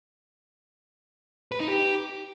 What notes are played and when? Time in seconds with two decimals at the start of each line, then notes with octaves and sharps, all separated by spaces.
1.52 B4
1.60 D#4
1.69 G4